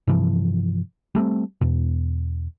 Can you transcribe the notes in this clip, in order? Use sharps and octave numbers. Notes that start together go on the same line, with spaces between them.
G2 C3 E3 F3
G3 A3 A#3 C4
E2 B2